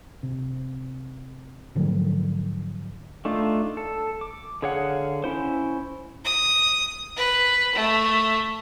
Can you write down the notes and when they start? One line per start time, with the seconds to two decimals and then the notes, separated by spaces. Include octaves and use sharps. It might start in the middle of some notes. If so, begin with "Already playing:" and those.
0.23 C3
1.75 G#2 D3 F3 F#3
3.25 A3 D4 D#4 F4
3.77 A4
4.21 D6
4.62 D3 G#4 C#5 F5 F#5
5.24 C#4 E4 C5
6.25 D#6
7.17 B4
7.75 A3